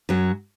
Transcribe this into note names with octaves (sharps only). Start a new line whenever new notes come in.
F#2 F#3